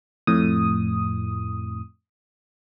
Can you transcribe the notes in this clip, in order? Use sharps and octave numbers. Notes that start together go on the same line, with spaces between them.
F2 A2 D#6